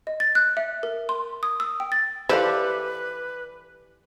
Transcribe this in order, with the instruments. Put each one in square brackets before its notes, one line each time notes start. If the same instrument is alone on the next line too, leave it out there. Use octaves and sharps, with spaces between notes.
[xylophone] D#5
A6
F#6
E5
A#4
C6
D#6
E6
G5
A6
[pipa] E3 D5 [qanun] G4 A4 [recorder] B4 [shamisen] C5 F5